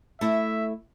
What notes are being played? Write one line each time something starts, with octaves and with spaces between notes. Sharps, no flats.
A3 E4 E5